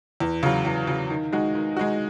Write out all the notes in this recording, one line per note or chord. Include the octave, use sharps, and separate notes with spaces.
E2
C#3 F#3
E2
C#3 F#3
D#3
G#3 D#4 F#4
D#3
G#3 D#4 F#4